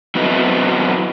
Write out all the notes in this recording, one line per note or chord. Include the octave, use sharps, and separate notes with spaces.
F#3 B3 C4 E4 B4 D#5